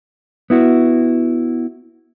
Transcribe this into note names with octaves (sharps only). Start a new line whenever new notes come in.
B3 E4 F#4